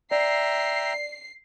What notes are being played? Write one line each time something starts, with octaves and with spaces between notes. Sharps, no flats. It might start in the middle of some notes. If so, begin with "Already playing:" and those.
D5 E5 G5 A#5 C7